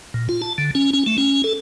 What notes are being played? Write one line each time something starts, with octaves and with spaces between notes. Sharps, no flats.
A#2
F4
A5
D3
C#4
C#4
A3
C#4
A4